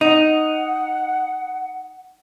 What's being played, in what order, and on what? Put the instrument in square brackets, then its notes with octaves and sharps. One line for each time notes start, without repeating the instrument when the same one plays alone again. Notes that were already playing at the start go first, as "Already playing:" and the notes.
[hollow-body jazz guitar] D#4 [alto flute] F#5